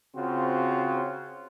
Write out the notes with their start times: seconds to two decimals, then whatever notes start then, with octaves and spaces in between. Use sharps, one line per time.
0.15 C#3 C4 F4 F#4 C5